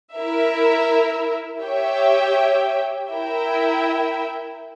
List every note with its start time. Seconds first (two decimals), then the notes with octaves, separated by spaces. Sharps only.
0.14 E4 A#4 E5
1.62 G4 C#5 E5 G5
3.09 E4 A#4 E5 G5